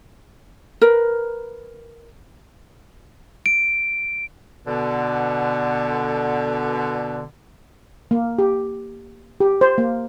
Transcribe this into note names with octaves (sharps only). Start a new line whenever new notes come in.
A#4 B4
D7
B2 D3
A#3
G4
G4
C5
A#3